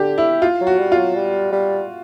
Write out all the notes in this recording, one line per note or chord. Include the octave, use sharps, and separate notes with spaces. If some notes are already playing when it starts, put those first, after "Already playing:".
Already playing: D3 G4
E4
F4
F#3
F#4
G3
F4
F#3
G3
G3